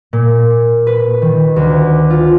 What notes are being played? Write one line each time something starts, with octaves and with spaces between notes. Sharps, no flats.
A#2
B4
D#3
D2
F4